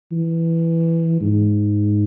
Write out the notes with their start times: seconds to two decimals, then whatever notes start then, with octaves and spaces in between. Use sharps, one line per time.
0.12 E3
1.21 G#2